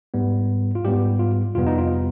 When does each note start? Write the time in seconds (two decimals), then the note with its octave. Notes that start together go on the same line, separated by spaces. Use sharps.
0.14 G#2 G3 B3
0.75 F4
0.85 G#2 G3 B3 G4
1.19 F4
1.55 F2 C3 G3 B3 F4
1.66 D#4
1.78 F4